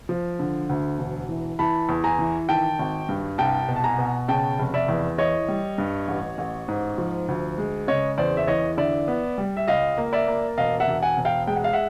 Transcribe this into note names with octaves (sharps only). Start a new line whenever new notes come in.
F3
D3
D2
E1
E3
E3 A5 B5
E2
G#5 A#5
E3
D#3 G5 A5
G#1
G2
C2 G5 A5
B2
A5
G#5 A#5
B2
C#3 G5 A5
F1
D5 E5
E2
E3 C#5 D#5
G3
G2
A1
A1
G#2
F3
D2
G#3
C#3 C#5 D#5
E2 C5 D5
E5
E3 C#5 D#5
D3 D5 E5
B3
G3
E5
C#2 D#5 F5
A#3
D5 E5
A#3
E1 D#5 F5
E5 F#5
E1
F#5 G#5
E1
F5 G5
G#3 G5
F#5
F5
E5 F#5